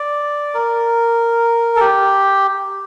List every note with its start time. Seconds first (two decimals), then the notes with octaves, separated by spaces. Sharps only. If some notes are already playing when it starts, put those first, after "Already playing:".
Already playing: D5
0.54 A#4
1.76 A4
1.81 G4